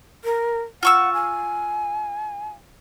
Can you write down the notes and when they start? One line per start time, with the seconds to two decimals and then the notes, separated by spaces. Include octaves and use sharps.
0.24 A#4
0.83 F4 F#5 C#6 E6
1.14 G#5